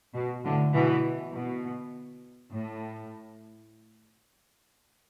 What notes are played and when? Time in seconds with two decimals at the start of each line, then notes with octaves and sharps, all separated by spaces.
0.15 B2
0.44 A2 D3
0.73 B2 E3
1.32 B2
2.50 A2